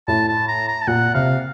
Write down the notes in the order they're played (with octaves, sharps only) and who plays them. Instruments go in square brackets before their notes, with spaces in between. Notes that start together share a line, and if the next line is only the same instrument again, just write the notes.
[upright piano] A2 [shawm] A5
[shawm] A5
A#5
A#5
A5
[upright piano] A#2 [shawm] F#5
[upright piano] C3 [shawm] F5